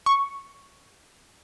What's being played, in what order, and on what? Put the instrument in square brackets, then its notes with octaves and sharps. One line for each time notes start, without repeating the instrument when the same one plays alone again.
[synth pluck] C#6